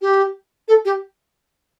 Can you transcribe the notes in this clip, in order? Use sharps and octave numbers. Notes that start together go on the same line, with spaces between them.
G4
A4
G4